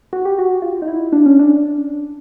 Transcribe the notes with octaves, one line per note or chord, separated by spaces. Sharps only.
F#4
G4
F#4
F4
D#4
E4
D4
C#4
D4